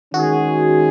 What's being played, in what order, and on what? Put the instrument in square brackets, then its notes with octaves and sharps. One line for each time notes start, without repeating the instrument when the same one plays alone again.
[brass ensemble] D#3 G#3 C#4 G#4 [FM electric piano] F#4